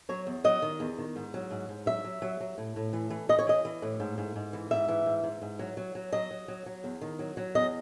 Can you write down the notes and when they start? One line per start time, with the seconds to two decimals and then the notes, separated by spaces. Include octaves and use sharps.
0.09 F#3 C#5
0.27 E2
0.44 F#3 D#5
0.62 D#3
0.80 E2
0.98 D#3
1.16 G#2
1.34 F#3
1.51 G#2
1.69 G#2
1.86 F#3 E5
2.04 F#3
2.22 F#3
2.40 F#3
2.58 A2
2.76 A2
2.93 E3
3.10 E3
3.29 E3 D#5
3.39 C#5
3.47 E3 D#5
3.65 E3
3.82 A2
4.00 G#2
4.18 G#2
4.36 G#2
4.53 E3
4.71 G#2 E5
4.88 E3
5.06 G#2
5.24 G#2
5.42 G#2
5.59 F#3
5.77 F#3
5.95 F#3
6.13 F#3 D#5
6.31 F#3
6.48 F#3
6.66 F#3
6.84 E2
7.01 D#3
7.19 F#3
7.37 F#3
7.55 E2 D#5